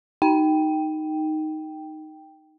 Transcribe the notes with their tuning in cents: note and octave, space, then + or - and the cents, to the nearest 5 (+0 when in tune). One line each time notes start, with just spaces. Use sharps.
D#4 +0 G5 +0